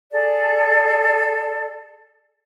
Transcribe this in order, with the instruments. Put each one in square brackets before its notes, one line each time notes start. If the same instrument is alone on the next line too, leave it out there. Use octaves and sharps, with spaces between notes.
[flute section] G#4 A4 D5